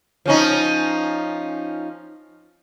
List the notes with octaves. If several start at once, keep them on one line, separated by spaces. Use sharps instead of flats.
F3 C#4 D#4